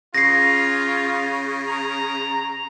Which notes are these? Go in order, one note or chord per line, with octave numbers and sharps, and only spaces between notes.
C#3 F4 A#6 C7
A#5